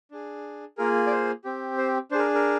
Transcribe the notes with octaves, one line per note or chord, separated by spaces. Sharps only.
D4 G#4
A#3 F4 G#4 A#4
D5
C5
C4 G4
C5
D4 G#4 A#4 C5
A#4